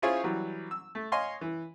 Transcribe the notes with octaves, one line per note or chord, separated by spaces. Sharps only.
C#4 E4 F4 G#4 C5 C#5
E3 F#3 G3
E6
A3
C#5 D#5 F5 G#5 C6
E3